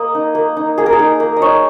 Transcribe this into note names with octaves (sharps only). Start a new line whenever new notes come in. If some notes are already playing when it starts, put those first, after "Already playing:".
Already playing: A#3 D#5
D#4
A#3
D#4
A#3 G#4
A#4
G#4
D#4
A#3
D#5
D#4 C#5